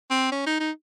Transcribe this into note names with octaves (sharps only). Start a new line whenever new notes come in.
C4
C#4
D#4
D#4